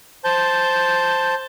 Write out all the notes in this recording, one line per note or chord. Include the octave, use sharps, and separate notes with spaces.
C5 A5 G6